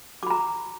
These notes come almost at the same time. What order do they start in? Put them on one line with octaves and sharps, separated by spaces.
D6 B5 A#5